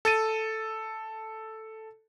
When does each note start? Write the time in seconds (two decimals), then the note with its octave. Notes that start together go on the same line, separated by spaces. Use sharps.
0.05 A4 A6 D#7